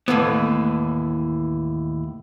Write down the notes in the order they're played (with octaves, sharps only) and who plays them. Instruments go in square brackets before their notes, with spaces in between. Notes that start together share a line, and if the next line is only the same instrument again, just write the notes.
[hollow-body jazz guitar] D#2 A2 E3 B3